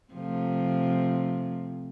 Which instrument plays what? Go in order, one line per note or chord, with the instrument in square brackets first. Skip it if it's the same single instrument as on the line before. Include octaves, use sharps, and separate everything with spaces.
[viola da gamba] C3 F3 A3